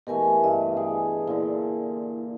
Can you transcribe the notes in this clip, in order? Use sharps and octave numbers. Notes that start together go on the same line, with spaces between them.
B2 E3 A3 G4 A#4 G#5
G2 D#5
G#4 D5 G#5
A#2 D3 E4